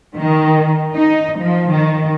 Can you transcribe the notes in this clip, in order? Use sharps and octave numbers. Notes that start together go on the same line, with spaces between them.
D#3
D#4
F3
D#3